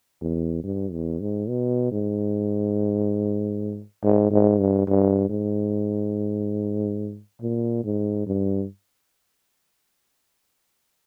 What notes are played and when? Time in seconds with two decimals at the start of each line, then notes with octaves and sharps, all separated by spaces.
0.21 E2
0.64 G2
0.92 E2
1.21 G#2
1.49 B2
1.92 G#2
4.03 G#2
4.31 G#2
4.60 G2
4.87 G2
5.30 G#2
7.41 A#2
7.84 G#2
8.27 G2